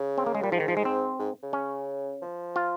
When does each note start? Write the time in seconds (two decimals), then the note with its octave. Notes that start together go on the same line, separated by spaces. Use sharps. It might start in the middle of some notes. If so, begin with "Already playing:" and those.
Already playing: C#3
0.18 C4
0.26 A#3
0.35 G#3
0.43 A#2 G3
0.52 G#2 F3
0.60 D#3
0.68 F3
0.77 G#3
0.85 C4
1.19 G#2
1.43 C#3
1.53 C#4
2.22 F3
2.56 F4